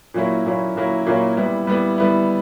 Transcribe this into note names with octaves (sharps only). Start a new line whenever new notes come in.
A#2 F#3 A#3 C#4 E4
A#2 F#3 A#3 C#4 E4
A#2 F#3 A#3 C#4 E4
A#2 F#3 A#3 C#4 E4
G3 B3 E4
G3 B3 E4
G3 B3 E4